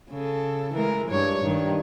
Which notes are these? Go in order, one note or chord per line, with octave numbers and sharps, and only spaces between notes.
C#3 A4
E3 G#3 A#4
G2 C#5
G2 D#3